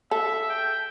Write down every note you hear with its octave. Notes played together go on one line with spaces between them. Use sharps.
A4 E5
G5